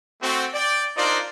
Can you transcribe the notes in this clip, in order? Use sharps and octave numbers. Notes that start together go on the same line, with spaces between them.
A3 C4 F#4
D5 G5
D4 D#4 F4 A#4 C5 D5